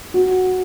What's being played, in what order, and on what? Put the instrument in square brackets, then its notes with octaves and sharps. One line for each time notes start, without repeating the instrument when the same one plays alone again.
[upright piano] F#4